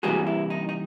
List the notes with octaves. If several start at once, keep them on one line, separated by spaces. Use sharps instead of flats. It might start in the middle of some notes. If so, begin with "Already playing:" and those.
C3 E3 G3 A#3 F#4 G#4
E4
D#4
D#4